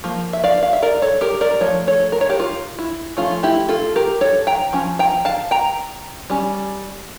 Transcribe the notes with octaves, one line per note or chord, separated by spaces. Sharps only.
F3 A#3
E5
D5 F5
F5
E5
A#4 D5
A4 C#5
G4 A#4
A#4 D5
A#4
F3 A3 C#5
A4 C#5
A#4
C#5
G4 A#4
F4
E4
F3 A3 C#4 F4
E4 G4
F4 A4
G4 A#4
A4 C#5
G5 A#5
F3 C#4
G5 A#5
F5 A5
G5 A#5
G3 C#4